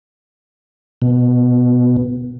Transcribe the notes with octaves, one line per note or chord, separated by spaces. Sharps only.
B2